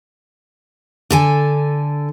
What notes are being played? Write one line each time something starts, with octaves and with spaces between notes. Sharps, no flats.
D3 A4 G#5